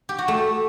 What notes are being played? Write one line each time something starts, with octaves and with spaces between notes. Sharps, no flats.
G4
F#4
A3